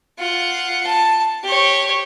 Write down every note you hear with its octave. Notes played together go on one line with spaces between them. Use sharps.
F4 F#5
A5
G4 C#5